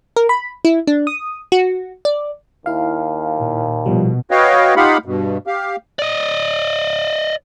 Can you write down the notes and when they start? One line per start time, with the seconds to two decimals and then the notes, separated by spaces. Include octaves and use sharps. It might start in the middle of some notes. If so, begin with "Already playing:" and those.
0.16 A#4
0.29 B5
0.65 E4
0.87 D4
1.07 D#6
1.52 F#4
2.05 D5
2.66 D#2 E4 F5
3.40 A#2
3.86 B2 F3 G3
4.31 F#4 B4 C#5 D#5 F5 G5
4.76 D#4 F4 G4 F5 F#5 B5
5.06 G2 B2
5.47 G4 F5
5.99 D5 D#5